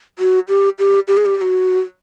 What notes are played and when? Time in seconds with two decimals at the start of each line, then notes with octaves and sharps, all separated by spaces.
0.19 F#4
0.49 G4
0.79 G4
1.08 G4
1.17 G#4
1.26 G4
1.37 G4
1.41 F#4